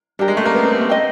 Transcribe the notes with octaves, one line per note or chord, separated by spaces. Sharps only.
G3 D4 G4 A#4
G#3
A3
A#3
B3
C4
A#3
A3
B4 D#5 G5